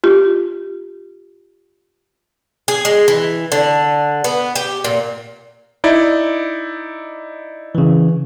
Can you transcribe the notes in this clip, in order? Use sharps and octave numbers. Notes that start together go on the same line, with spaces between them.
F4 G4
G#4
G#3
E3
D3
B3
G4
A#2
D#4 E4 D5
C#3 E3